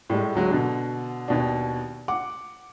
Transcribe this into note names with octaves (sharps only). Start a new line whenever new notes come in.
A2 G3 G#3
D2 F#3 G#3
B2 D3
D#2 B2 D4
F#5 D6